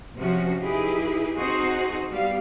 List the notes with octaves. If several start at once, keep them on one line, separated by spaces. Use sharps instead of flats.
C3 F3 C#4 F#4
D#4 E4 G4 G#4 B4
C4 D#4 F#4 G#4 C5
G3 B3 G4 F5